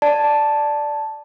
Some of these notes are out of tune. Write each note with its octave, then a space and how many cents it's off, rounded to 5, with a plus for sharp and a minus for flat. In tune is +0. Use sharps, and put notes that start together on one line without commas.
D5 +0 A5 +0